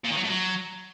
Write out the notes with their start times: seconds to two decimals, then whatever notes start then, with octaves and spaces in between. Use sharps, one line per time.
0.04 A#2
0.10 D#3
0.17 F#3
0.23 A2
0.30 F#3